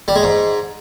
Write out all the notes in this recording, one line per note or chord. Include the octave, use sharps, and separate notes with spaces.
G3
G#3
G#2